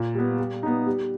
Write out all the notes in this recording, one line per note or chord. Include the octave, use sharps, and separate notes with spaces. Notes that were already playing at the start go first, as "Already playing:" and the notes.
Already playing: A#2
G3 B3
G3
B3 D#4
G3